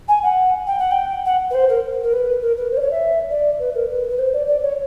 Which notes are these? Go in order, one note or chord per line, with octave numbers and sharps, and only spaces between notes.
G#5
F#5
G5
F#5
G5
F#5
B4
C5
A#4
A#4
B4
A#4
B4
C5
D5
C#5
E5
D5
B4
A#4
B4
B4
C5
D5
D5
C#5